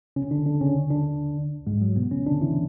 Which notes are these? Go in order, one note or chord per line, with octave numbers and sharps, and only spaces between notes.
C#3 C#4
D3 D4
D3 D4
C#3 C#4
D3 D4
G#2 G#3
F#3
B2 B3
C#3 C#4
D3 D4
E3 E4